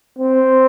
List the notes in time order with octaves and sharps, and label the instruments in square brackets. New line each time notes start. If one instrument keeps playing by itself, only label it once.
[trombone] C4